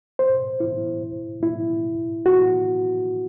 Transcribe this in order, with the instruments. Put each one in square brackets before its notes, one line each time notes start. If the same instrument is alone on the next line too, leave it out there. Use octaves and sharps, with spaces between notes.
[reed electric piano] C5
E4
E4
F#4